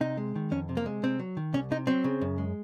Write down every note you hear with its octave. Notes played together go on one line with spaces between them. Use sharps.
C3 D#4
G#3
D#3
F2 C#4
C3
A#3
G#3
C3 C4
F#3
D#3
C2 C#4
C3 D#4
F#3 C4
C#3
F#2
G#3